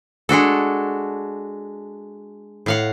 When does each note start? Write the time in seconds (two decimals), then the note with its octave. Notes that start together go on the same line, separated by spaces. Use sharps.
0.29 G#3 D4 F#4 A4
2.66 A2 F5 F#5